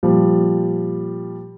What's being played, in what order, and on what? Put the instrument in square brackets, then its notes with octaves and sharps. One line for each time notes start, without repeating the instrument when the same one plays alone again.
[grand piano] A#2 F3 G3